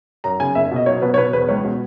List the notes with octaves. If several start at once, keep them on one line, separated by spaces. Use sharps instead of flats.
F#2 A#5
C#3 G#5
F#1 E5
E5
B2
D#5
F#3 C#5
B2 B4
C#5
B2 B4
E2 B4
C#2 C#5
B2